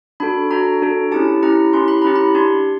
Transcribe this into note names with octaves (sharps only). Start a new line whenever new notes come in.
D4 F#4 A4 B5
D4 F#4 A4 A#5
D4 F#4 A4
C#4 E4 G4 A5
C#4 E4 G4 A#5
C#4 E4 G4 C6
B5
C#4 E4 G4 A#5
B5
D4 G4 C6